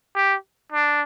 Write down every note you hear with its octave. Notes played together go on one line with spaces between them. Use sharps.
G4
D4